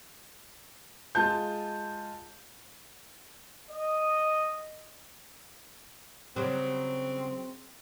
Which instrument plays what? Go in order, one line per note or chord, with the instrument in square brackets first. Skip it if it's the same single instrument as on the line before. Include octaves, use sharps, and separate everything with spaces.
[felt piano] G#3 F4 A5 G6
[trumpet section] D#5
[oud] C#3 F#3 G3 [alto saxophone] C4